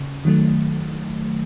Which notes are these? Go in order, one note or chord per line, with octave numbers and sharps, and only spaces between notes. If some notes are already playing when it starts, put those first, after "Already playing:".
Already playing: C#3
D#3 F#3 A3